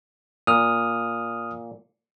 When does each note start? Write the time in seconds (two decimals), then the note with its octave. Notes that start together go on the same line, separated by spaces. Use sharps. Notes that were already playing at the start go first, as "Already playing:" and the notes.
0.47 A#2 D#6 F6